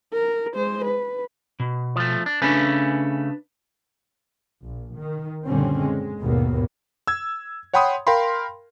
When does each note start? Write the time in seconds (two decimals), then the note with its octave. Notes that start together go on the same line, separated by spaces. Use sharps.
0.14 A#4
0.54 G#3 C5
0.85 B4
1.60 B2
1.96 F3 A3
2.26 D4
2.42 C#3 A3 C#4 D4 B4
4.64 A#1
4.96 D#3
5.46 F#1 A#2 D3 G3 C4 C#4
5.80 G#3
6.20 G#1 D#2 G#2 B2 A#3 B3
7.07 E6 G#6
7.73 C#5 F#5 G5 B5 C6 D#6
8.07 A#4 F5 G5 B5 C6